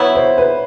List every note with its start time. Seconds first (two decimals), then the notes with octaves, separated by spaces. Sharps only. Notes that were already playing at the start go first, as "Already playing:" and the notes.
Already playing: F#3 B3 E4 C#5
0.15 C5
0.38 B4